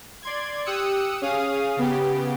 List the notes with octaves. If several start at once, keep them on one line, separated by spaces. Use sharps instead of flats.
D5 C6 G#6
G4 D#6 E6 F#6 C#7
C#4 G#4 F5 D#6
C#3 B3 G4